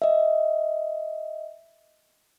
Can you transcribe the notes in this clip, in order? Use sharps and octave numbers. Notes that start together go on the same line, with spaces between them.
D#5 E5